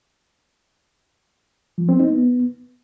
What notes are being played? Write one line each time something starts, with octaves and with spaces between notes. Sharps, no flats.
F3
C4
D#4
B3